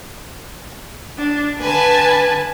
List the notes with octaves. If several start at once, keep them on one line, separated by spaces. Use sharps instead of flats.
D4
D3 B4 G#5 A5